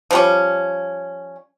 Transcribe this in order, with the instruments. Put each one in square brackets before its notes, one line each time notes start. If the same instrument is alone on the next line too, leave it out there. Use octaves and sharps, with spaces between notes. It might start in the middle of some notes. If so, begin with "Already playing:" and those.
[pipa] F3 G3 C#4